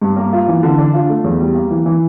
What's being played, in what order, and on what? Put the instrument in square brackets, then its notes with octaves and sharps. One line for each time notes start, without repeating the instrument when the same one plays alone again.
[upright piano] G2
A#3
F4
E3
D3
D4
F4
A3
E2
G3
A#3
E3
E3